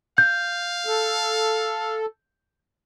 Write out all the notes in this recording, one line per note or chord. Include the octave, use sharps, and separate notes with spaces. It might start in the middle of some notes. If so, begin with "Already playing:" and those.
F5 G6
A4